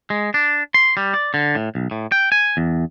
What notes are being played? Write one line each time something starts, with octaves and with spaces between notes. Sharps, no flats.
G#3
D4
C6
G3
D5
D3
A2
B1
A2
G5
G#5
E2